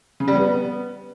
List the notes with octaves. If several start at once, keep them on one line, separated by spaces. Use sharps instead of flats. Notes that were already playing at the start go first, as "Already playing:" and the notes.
C#3
G3
B3